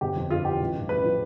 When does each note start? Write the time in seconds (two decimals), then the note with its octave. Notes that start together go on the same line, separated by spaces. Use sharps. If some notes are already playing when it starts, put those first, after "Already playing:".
0.01 G1 G4
0.16 F2
0.30 G1 F4
0.45 E3 G4
0.61 A1
0.76 G2
0.89 A1 B4
1.04 F3